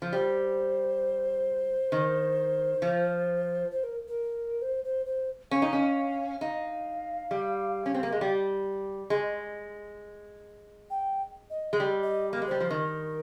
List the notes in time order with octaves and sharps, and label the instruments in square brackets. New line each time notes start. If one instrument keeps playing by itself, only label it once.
[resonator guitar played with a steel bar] F3
[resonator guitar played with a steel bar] G3 [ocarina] C5
[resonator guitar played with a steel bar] D#3
F3
[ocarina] C5
A#4
A#4
C5
C5
C5
[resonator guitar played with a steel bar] C#4 [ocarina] F5
[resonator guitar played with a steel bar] D#4
C#4
[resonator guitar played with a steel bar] D#4 [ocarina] F5
[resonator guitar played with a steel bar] G3
C#4
C4
A#3
G#3
G3
G#3
[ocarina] G5
D#5
[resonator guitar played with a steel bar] G#3
G3
[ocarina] D#5
[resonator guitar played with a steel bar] A#3
G#3
[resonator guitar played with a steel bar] G3 [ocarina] C5
[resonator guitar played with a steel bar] F3
[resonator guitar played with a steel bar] D#3 [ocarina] A#4